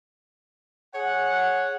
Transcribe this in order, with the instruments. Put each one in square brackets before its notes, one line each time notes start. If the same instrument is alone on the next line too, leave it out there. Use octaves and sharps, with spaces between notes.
[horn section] G#4 C#5 F#5